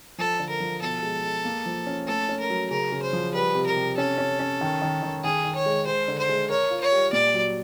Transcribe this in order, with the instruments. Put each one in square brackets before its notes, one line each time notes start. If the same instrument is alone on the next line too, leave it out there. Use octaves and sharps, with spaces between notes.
[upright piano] F3 [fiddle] A4
[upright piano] D3
[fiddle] A#4
[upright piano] F3
[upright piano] B2 [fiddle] A4
[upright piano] G#3
G#3
A#3
F3
C#4
[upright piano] A3 [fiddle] A4
[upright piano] C#4
[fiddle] A#4
[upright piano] F#3
[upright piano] C#3 [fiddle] A#4
[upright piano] C#3
[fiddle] C5
[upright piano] F3
[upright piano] G3 [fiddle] B4
[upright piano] C3
[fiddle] A#4
[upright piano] C3
[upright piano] C#4 [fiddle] A4
[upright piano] C#4
C#4
D#3
D#3
D#3
[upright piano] D#3 [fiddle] G#4
[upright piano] D#3
[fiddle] C#5
[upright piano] G#3
[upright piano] G#3 [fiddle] C5
[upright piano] D3
[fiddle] C5
[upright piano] G#3
[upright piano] A#4 [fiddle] C#5
[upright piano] F4
[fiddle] C#5
[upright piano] G3
[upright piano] A#2 [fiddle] D5
[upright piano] F#3